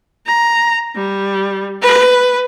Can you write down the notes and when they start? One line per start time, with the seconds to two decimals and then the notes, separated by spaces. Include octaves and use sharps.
0.27 A#5
0.95 G3
1.82 B4